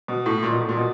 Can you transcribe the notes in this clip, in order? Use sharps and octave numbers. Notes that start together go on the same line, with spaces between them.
B2
A2
A#2
B2
A2
A#2
B2